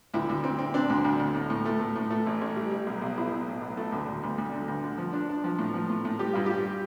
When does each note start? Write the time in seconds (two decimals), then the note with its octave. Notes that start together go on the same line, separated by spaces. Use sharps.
0.14 D2 E4
0.29 D2
0.44 C4
0.59 C4
0.74 C4 D4
0.89 D2
1.04 D2
1.19 D2
1.35 A2
1.50 A2
1.65 A3
1.80 A2
1.96 A2
2.10 A3
2.26 A1
2.41 A1
2.56 G3
2.71 G3
2.86 B1
3.01 B1
3.17 B1 E4
3.32 B1
3.47 A2
3.62 B1
3.77 A3
3.92 D2
4.07 D2
4.23 D2
4.38 D2
4.53 D3
4.68 D2
4.84 D3
4.98 F3
5.13 D4
5.29 D4
5.44 F3
5.59 A2
5.74 F3
5.89 A2
6.05 A2
6.19 G3 G4
6.33 G2 F4
6.46 G3 G4